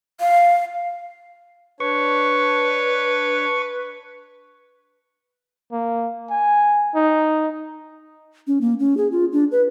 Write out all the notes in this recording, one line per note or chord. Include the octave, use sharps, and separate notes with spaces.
F5
D4 B4 C#5 C#6
A#3
G#5
D#4
C#4
A#3
C#4
G#4
F4
D4
B4